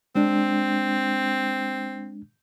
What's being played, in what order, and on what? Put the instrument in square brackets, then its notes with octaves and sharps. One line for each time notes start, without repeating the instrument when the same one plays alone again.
[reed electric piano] G#3 D4 [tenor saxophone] C4